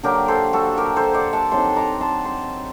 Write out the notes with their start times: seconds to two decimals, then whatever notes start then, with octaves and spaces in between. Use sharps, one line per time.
0.03 D3 F#3 A#3 G4 A#4
0.28 A4 C5
0.53 F#4 A4
0.78 G4 A#4
0.96 A4 C5
1.14 D5 F#5
1.33 F#5 A5
1.51 F#3 C4 D#4 A5 C6
1.76 A#5 D6
2.01 A5 C6
2.25 A5 C6